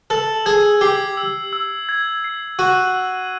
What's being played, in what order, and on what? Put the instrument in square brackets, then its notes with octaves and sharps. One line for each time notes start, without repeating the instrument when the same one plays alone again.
[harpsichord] A4 [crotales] E6
[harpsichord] G#4 [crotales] G#6
[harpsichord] G4 [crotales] C7
[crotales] E6
E6
G#6
C7
[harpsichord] F#4 [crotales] D#7
[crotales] E6